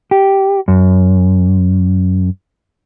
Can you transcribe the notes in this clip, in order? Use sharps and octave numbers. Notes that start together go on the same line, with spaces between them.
G4
F#2